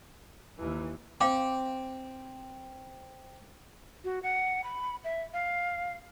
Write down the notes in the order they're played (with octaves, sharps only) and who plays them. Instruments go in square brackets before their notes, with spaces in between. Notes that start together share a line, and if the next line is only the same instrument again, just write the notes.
[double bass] D#2 [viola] E3
[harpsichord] C4 [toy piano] F5 G5 D6
[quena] F#4
F#5
B5
E5
F5